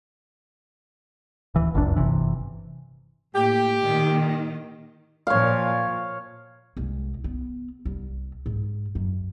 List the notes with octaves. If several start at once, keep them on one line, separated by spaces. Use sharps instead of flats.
D1 E3
G1 C#2 F#2 D4
G1 C2 C3 E3
A2 A#3 G4
A#2 D#3
A#2 F3 C#5 F5
C2 G#3
B3
C2
G#2
F#2